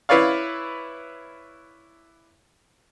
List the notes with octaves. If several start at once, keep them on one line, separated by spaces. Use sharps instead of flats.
E4 B4 C#5 D5 F5